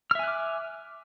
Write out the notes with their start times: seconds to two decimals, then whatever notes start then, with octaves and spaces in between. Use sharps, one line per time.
0.11 F6
0.15 E5
0.19 G#5
0.23 F#6
0.28 D6